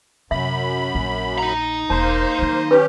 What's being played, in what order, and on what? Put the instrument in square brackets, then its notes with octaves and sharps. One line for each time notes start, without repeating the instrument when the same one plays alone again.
[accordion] F#2 B5 [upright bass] C3 [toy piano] E5
[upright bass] A#1
[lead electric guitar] D#4 A#5
[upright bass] E1 [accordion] A#3 C5 [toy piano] A5
[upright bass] D#3 F#3
[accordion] C#4 G4 [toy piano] B4